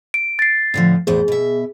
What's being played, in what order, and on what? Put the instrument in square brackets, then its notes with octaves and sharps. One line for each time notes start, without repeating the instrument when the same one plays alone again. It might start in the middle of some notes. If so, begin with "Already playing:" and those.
[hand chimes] D7
A6 C7
[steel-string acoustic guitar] A2 D3 F3
[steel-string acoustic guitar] E2 A2 C5 [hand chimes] G#4
[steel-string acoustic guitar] B2 E5